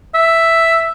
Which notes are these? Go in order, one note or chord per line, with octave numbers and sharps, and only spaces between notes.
E5